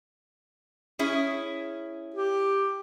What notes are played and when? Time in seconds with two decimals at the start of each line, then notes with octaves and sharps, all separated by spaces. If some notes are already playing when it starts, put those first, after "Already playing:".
0.99 C#4 E4 G#4
2.14 G4